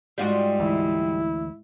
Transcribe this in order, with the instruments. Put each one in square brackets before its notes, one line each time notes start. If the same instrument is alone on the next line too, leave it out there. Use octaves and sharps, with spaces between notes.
[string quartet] G#2 [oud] G3 F4 F#4
[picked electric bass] D2 E3 [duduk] E4